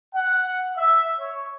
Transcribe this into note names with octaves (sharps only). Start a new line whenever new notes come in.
F#5
E5
C#5